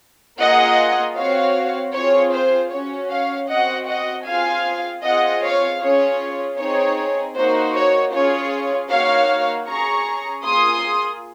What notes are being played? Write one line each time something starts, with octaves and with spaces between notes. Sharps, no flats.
A#3 F4 G#4 D#5 F#5
C4 F#4 C#5 F5
C4 F4 G#4 C#5
C5
C#4 F#4 C#5
C#5 F5
C4 F#4 D#5 F#5
D#5 F#5
C4 F4 G#4 F5 G#5
C4 F4 G#4 D#5 F#5
C#5 F5
C#4 F4 G#4 C#5
C4 D#4 G#4 C#5
A#3 D#4 F#4 C5
C#5
C#4 F4 G#4 C#5
A#3 D#4 F#4 C#5 F5
C#4 G#4 A#5 C#6
A#3 F4 G#4 C6 D#6